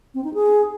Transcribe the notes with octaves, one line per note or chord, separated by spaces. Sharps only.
C4
D#4
G#4